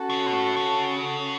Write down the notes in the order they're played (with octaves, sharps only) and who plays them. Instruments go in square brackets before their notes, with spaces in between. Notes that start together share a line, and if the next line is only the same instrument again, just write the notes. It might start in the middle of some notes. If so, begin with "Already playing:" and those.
Already playing: [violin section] C#4 F#4 A4
[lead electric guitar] C#3
B2
A2
C#3